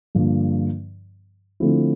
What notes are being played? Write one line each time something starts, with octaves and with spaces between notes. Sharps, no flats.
G2 D3 F3 A#3 D4
D3 F3 A3 C4 E4